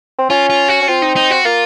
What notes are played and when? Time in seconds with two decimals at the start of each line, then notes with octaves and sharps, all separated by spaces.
0.19 C4
0.30 C#4 F4
0.50 F4
0.68 F#4
0.82 C#4
0.88 C4 F4
1.02 D#4
1.16 D#4
1.31 F#4
1.45 A#3 F4